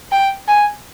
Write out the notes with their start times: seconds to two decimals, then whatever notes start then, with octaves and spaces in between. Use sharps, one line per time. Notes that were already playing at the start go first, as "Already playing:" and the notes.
0.12 G5
0.48 G#5